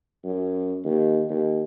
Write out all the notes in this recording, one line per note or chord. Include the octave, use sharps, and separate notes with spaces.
F#2
D#2
D#2